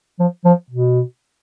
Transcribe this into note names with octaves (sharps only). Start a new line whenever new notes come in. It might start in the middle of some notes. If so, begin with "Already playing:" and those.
F3
F3
B2